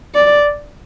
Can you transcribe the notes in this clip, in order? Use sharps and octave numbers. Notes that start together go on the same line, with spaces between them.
D5